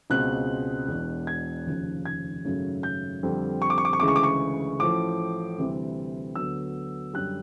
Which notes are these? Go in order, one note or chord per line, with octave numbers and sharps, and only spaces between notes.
C#2 B2 G#3 C4 F#6
E1 E2 B2
G#6
F1 D#2 C#3 F3
G#6
G#1 F#2 C#3 F#3 A3
G6
F2 D3 G3 C4
C#6
D6
C#6
D6
C#6
D2 C#3 E3 G#3 D6
C#6
D6
C#6
A1 A2 F3 D6
D2 C3 E3 G3 C4
D2 D3 F#3 B3 E6
F#2 D3 G3 F#6